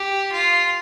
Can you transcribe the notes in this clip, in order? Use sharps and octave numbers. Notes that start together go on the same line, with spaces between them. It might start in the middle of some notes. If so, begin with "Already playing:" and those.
Already playing: G4
F4